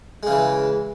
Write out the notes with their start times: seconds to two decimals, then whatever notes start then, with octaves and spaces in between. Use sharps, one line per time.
0.23 G#3
0.27 C#3
0.31 E3